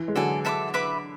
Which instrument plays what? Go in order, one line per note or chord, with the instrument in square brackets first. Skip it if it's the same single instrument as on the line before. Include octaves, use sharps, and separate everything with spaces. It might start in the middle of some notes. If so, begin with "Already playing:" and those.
Already playing: [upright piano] E3
G#3
[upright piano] D3 F#3 [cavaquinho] A4 D5 G#5
[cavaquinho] A4 E5 B5 D6
B4 E5 B5 D6